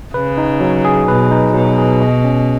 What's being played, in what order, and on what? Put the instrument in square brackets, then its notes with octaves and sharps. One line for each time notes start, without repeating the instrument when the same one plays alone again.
[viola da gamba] C#3 [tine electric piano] B4
[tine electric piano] D#4
F#3
G#4
[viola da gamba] B2 [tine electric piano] B4
[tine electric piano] D#4
[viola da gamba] B2 [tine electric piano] F#3
[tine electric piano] G#4
D#5
C#4